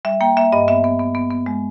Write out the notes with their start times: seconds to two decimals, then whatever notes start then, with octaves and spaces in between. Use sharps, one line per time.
0.05 G3 E5
0.21 A#3 G5
0.37 A#3 E5
0.52 G2 D#5
0.68 B3 E5
0.84 B3
1.00 B3
1.15 B3
1.31 B3
1.46 G#3